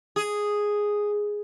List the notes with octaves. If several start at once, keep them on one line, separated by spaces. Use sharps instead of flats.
G#4